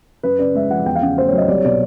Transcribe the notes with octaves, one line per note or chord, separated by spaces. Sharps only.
F#2 B4
C#3 D5
G#3 E5
F3 F#5
E2 G5
F5
C#3 F#5
A3 C5
C#5
F#3
D#5
C2 D5
C#5
B2 D5